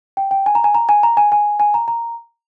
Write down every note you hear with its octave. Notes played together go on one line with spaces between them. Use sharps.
G5
G5
G#5
A#5
G#5
A#5
G#5
A#5
G#5
G#5
G#5
A#5
A#5